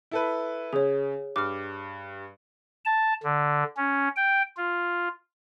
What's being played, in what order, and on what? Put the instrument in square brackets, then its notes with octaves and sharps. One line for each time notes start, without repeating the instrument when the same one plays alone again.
[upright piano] E4 A4 B4
[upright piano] C#3 [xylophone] G#4 C#5
[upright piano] G2 [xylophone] D6 F6
[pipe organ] A5
D3
C#4
G5
F4